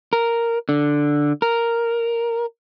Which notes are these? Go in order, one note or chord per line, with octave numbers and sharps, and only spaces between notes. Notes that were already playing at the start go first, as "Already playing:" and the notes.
A#4
D3
A#4